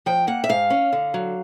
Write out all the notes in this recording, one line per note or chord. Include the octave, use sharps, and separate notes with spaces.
F3 G5
A#3 F#5
E5
G#2 F5
C#4
D3
F#3